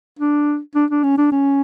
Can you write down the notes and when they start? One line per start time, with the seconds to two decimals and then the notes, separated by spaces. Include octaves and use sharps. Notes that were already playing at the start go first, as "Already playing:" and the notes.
0.19 D4
0.76 D4
0.91 D4
1.04 C#4
1.18 D4
1.32 C#4